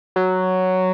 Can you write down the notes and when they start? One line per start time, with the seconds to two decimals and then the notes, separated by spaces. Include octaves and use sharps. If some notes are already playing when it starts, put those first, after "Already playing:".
0.16 F#3